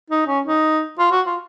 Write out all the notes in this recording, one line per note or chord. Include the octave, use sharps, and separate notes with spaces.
D#4
C#4
D#4
F4
F#4
F4